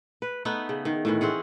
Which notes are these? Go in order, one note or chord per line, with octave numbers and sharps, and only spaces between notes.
B4
A3 B3 D#4 B4
C#3
D#3
A2 D#3 E3
C4 C#4 G#4 F#5